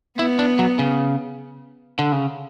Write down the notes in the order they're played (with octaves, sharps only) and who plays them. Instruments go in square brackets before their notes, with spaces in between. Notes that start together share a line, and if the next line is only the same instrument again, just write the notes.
[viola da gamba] B3 [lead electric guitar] E4
[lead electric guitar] D4
F#3
C#3
D3
C#3